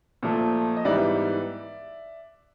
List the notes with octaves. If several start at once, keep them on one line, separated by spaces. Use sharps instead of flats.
A#2 F3 A3
D#5
G#2 E3 G3 B3 D5 E5